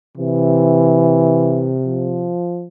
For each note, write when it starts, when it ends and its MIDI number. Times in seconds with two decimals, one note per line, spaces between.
0.18 2.38 48
0.18 1.78 52
1.86 2.68 53